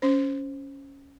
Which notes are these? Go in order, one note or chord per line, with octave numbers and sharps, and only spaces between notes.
C#4 C5